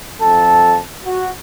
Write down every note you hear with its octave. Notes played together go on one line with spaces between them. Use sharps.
F2 A4 A5
F#4